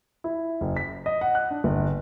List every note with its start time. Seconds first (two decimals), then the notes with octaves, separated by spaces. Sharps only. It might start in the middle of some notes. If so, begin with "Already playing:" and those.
0.24 E4
0.61 F#1
0.77 B6
1.06 D#5
1.21 F#5
1.35 F#6
1.51 D4
1.64 G1